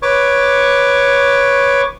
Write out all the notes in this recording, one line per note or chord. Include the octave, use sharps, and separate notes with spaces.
B4 C#5 C#6 D6